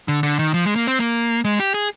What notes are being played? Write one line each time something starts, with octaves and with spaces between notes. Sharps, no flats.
D3
D3
D#3
F3
G#3
A#3
C4
A#3
G#3
G4
G#4